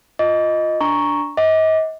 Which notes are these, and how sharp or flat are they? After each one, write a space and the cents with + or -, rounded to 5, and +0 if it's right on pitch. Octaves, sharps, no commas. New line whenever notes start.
F4 +5 D#5 +0 D6 -35
D4 +0 A#5 +0 C#6 +0
D#5 +35 F#5 +0 D6 +0